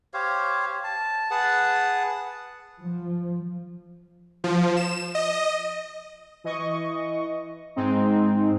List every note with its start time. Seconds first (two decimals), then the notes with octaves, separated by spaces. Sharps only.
0.14 G4 C5 C#5 F5
0.84 A5
1.31 G#4 B4 F#5 A5
2.82 F3
4.44 F3
4.77 E7
5.15 D#5
6.44 E3 D#5 C#6
7.76 G#2 G#3 C4 D#4